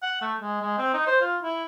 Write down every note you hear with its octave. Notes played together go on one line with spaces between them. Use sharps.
F#5
A3
G#3
G#3
C4
D#4
C5
F4
E4